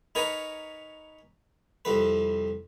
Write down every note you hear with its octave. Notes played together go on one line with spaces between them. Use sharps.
D#4 A#4 B4 C#5 G#5
C2 F2 B4